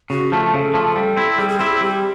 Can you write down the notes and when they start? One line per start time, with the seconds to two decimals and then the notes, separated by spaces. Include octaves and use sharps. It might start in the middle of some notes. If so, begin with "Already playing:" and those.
0.10 C#3 F#4
0.32 F3 A3 G#4
0.53 C#3 A4
0.74 F3 A3
0.96 G3
1.17 C4 E4
1.38 G3 G#4
1.49 G#4
1.59 C4 E4 G#4
1.70 G4
1.81 G3 G4